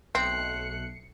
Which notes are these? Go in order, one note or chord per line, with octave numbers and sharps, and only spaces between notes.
B1 A3 C4 F#6 C7 C#7